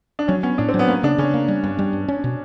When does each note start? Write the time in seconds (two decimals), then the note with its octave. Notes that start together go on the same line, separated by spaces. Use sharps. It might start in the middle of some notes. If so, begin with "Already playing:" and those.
0.19 D4
0.28 F#3 C#4
0.43 B3 C#4
0.58 A2 D4
0.69 C4
0.74 F#3
0.79 B3
0.88 A#3 C#4
1.03 C#3 D4
1.18 C#3 C#4
1.34 A#3
1.48 G3
1.64 G2
1.79 G3
1.93 G2
2.08 C#4
2.24 B2